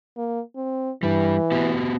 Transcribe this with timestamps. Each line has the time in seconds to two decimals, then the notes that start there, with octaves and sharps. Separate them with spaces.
0.17 A#3
0.56 C4
1.03 G2 E3 G3
1.52 B3 F#4 G4